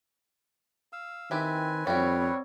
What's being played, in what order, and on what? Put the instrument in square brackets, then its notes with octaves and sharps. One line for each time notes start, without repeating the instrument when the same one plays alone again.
[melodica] F5 E6
[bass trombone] D#3 [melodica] C4 B4 G#5 [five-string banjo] E4 G4
[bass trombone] F2 [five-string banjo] G3 F#4 [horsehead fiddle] C4 C#5 [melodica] B4